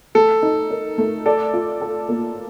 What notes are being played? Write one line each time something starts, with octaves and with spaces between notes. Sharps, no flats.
A3 A4
D#4
A#4
A3
A4 D5
F4
A4
A#3